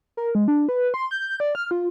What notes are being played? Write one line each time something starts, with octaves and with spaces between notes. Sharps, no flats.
A#4
G#3
D4
B4
C6
G6
D5
F6
F4